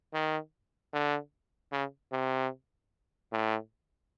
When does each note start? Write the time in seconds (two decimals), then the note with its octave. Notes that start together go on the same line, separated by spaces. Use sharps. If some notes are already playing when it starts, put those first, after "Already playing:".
0.14 D#3
0.93 D3
1.72 C#3
2.12 C3
3.32 A2